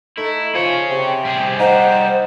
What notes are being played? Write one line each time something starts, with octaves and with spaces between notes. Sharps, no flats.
A3 D#4 E4
F3 G#4 C#5
C3 G5
G3 G#4
D#4 C5 F#5